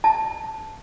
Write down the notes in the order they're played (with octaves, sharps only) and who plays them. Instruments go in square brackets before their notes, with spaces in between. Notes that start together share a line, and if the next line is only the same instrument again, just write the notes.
[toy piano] A5